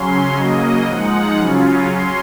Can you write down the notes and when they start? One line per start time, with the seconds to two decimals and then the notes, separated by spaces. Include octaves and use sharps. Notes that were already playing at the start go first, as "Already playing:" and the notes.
Already playing: C#3 F#3 C#4 C6
0.37 C#3 F#3 A#3 D#5
0.87 F3 G#3 D#4 F#5
1.39 C#3 F#3 C#4 F4
1.89 F#3 C#4 C6